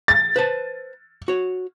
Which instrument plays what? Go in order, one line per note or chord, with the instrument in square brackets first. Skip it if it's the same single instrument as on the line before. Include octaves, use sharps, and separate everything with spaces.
[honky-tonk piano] A6
[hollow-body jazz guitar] B4 C5 A5
F#4 C#5